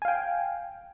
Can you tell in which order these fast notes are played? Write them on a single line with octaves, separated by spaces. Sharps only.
G#5 F5 G5